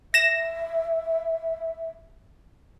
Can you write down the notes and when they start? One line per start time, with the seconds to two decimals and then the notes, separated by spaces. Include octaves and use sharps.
0.14 E5 A#6 E7